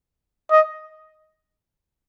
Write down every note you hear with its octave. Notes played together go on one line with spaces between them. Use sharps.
D#5